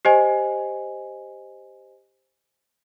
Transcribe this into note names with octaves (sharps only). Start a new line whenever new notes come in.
G4 C5 D#5 G#5